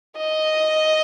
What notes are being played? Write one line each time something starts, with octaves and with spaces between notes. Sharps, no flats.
D#5